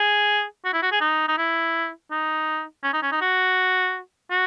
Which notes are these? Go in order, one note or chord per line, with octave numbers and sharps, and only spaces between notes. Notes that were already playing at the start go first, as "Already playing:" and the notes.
Already playing: G#4
F#4
E4
F#4
G#4
D#4
D#4
E4
D#4
C#4
D#4
C#4
D#4
F#4
F#4